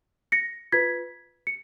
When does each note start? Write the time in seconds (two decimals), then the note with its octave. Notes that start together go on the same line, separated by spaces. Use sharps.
0.32 A#6 C#7
0.72 F4 B4 G#6 B6
1.47 C#7